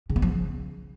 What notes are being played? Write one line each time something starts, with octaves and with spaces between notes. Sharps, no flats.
C#3
B3
F3
C#3